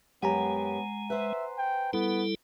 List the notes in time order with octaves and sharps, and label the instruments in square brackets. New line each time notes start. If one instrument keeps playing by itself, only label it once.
[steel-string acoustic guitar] F#2 G4 [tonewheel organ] G#3 [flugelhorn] B3 [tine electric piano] F#5 G#5 A#5
[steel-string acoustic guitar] B4 C5 [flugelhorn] E5
[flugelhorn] G5
[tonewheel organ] G3 E4 A4 [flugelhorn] B3